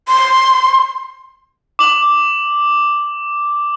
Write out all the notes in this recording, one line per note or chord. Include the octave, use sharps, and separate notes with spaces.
C6
D6 F#7